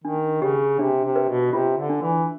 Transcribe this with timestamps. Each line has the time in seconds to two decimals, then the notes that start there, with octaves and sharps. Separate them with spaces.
0.04 D#3 D4
0.42 C#3 G4
0.79 C3 D4
1.04 C3
1.16 B4
1.28 B2
1.53 C3 F4
1.78 D3
1.90 D4
2.02 E3